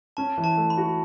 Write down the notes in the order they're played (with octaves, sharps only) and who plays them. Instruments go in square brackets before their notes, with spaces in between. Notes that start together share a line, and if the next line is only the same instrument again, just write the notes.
[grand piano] C#4 [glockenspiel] A5
[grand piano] E3
[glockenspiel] A5
[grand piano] A3
[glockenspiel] B5
[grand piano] F#4